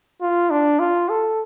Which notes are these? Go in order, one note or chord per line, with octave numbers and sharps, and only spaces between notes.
F4
D4
F4
A4